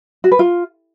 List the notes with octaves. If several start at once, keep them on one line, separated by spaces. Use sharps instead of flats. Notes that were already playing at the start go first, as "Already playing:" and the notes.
F#4
B4
F4